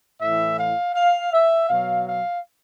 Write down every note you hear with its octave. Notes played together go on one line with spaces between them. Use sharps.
A2 E3 E5
F5
F5
E5
B2 F#3 F5
F5